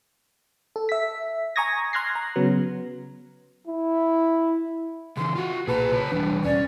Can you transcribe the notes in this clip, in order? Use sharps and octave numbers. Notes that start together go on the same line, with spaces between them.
A4
E5 B6
G#5 A#5 C#6 D#6 G#6 A#6
C6 F6 F#6 G#6 A#6 C7
A#5
C#3 F#3 B3
E4
C#3 E3 C6
F4 F#4 F#5
B1 A#2 G#4 B4 A5 A#5
C#3 C#5 A5
E1 E3 G3 D4
E2 B2 G3 C#4 D5